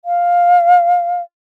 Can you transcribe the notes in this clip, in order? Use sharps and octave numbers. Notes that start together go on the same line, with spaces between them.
F5